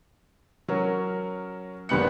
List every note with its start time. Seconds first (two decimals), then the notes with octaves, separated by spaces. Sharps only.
0.68 F#3 C#4 A#4
1.89 F#1 D3 G3 B3 F#6 C#7